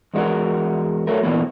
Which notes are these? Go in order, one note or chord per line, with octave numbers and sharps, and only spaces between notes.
E2 G#3 D#4 F#4 A#4
F#3 A3 A#4
A#2 E3 A#3 B3